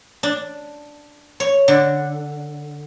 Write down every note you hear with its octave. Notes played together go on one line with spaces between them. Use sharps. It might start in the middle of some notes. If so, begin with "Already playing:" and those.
D4
C#5
D3